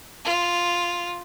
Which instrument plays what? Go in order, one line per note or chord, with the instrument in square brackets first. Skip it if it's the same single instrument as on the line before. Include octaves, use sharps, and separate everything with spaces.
[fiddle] F4